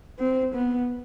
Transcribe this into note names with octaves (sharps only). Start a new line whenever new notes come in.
C4
B3